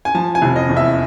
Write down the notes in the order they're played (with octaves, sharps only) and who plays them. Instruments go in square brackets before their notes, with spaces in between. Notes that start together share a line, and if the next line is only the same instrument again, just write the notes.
[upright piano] G#5
F3 A5
G#5
F1
D#5
E2
E5